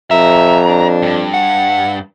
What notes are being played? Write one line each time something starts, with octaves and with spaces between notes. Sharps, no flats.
F2 E5 A#5
D4
G2
F#5